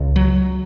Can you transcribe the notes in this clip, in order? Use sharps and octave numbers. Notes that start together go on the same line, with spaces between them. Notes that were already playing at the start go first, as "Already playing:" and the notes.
Already playing: C#2
F#3